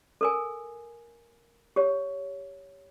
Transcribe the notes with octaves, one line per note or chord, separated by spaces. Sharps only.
A4 A#4 G#5
G4 C#5